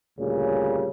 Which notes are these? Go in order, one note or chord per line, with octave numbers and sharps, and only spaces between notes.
D2 A#2 C#3 G3